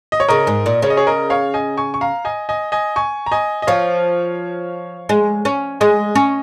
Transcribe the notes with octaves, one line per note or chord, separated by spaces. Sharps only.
D#5
C#5
C#3 A#4 D#5
G#2
A#2
C#3 C#5
D#5
G#4 C#5
A#4 D#5
C#5 F5
D#5 G#5
G#5 C#6
C#6
F5 A#5
D#5 G#5
D#5 G#5
D#5 G#5
G#5 C#6
A#5
D#5 G#5
D#5
F3 C#5 F5
G#3
C#4
G#3 D#5 G#5
C#4